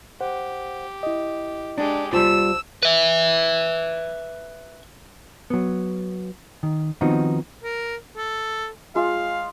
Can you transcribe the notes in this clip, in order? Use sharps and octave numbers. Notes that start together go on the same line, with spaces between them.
G4 C5 F#5
E4 D#5
G#3 D4 G4
C2 G3 F4 C5 A5 E6
B4 E5
F#3 B3
D#3
D#3 F3 B3 C4 D#4 F#4
A#4
A4
G#3 F4 F5